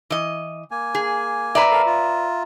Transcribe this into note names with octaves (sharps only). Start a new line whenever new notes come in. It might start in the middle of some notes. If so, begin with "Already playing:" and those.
E3 D#5
A#3 G#5
G#4
B4 D5 E5 A#5
A4 A#4 F5
F4